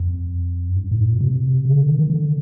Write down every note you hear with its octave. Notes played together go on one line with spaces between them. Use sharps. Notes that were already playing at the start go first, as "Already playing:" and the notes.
Already playing: F2
F#2
G2
A2
A#2
B2
C3
C#3
D3
D#3
D#3
D3